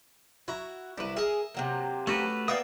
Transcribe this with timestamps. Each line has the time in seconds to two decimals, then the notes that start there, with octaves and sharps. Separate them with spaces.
0.48 E4 F#4 A#5
0.98 C2 E4 B4
1.17 G#4 A#4 D#5 E5
1.54 C3 F#3 A#3
2.07 A3 C#4 F#4 G4 B4
2.48 A#3 B3 D5 E5 F5 G5 D#6